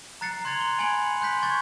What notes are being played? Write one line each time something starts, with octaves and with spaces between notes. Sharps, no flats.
A#5 F#6 A6 C7 C#7
A#5 C6 F#6 G#6 A6 F7
G7
G#5 B5 G#6 C#7 D7 F#7
C6 F#6 G6 B6
C#6 G#6 A6